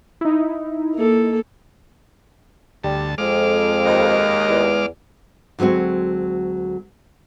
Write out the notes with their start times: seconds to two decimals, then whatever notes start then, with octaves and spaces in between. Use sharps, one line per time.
0.21 D#4 E4
0.94 A#3 A4
2.84 D2 G3 A5
3.18 F2 G#3 D6 F6
3.85 D#2 D#5
4.48 E2
5.59 D2 F#3 G#3 C4 F#4